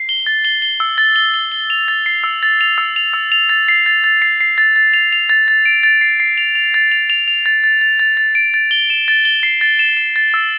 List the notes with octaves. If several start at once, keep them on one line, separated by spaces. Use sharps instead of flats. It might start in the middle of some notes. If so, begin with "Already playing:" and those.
Already playing: C7
G7
A6
G7
G7
E6
A6
G7
G7
G7
F7
A6
C7
E6
A6
F7
E6
F7
E6
F7
A6
C7
A6
A6
C7
C7
A6
A6
F7
F7
A6
A6
D7
A6
C7
C7
F7
F7
A6
F7
F7
F7
A6
A6
A6
A6
A6
D7
A6
G7
E7
A6
G7
C7
A6
E7
E7
A6
E6